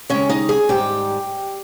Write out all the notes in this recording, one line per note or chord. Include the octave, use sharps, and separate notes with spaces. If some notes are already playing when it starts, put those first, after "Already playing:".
D#2 C#3 G#3 C#4 C#5
D#4 D#5
G#4 G#5
G#2 D#3 G3 G4 G5